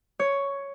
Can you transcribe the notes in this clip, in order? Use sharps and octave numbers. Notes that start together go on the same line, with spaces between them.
C#5